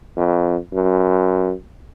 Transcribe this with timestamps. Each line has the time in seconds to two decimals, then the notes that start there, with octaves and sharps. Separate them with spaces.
0.17 F2
0.74 F#2